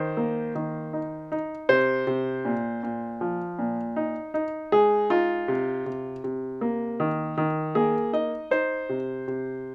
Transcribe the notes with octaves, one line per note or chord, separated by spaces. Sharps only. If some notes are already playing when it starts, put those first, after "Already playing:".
Already playing: D#3 C5
A#3
D#3
D#4
D#4
C3 C5
C3
A#2
A#2
F3
A#2
D#4
D#4
G#3 G#4
D#4 F4
C3
C3
C3
A#3
D#3
D#3
A#3 G#4
D#4 D#5
D#4 C5
C3
C3